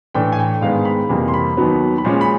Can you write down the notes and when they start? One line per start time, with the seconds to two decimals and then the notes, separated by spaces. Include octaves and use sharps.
0.14 A2 E3 A3 D4 G5
0.32 G#5
0.39 G5
0.61 G#2 D#3 G#3 B3 D4 F5
0.85 B5
1.09 F2 C3 E3 G3 A#3
1.28 C6
1.34 B5
1.57 D#2 D#3 F#3 B3
1.98 B5
2.04 A#2 F3 G#3 C#4 C6
2.21 B5